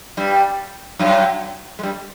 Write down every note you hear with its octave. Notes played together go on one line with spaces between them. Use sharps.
G2 G3
F#2 F#3
G#3
G2 G3